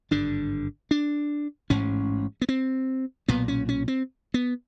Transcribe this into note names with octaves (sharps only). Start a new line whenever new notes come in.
G#1 G2 D3 D4
D4
A1 G#2 C#4
B3
C4
B1 A#2 B3
C#4
C#4
C4
B3